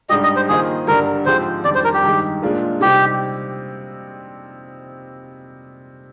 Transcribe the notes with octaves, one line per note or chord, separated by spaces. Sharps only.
G#2 G3 D4 G4 D#5
D#5
C5
D#3 A#3 F4 G#4 C5 D#5
G2 D3 G3 D4 A#4
G#2 F3 G#3 C4 G4 C5
F2 D#3 G3 D4 D5
C5
A#4
G4
G2 D#3 G#3 D#4
A#2 G#3 D4 F4 A#4
C3 G3 C4 D#4 G4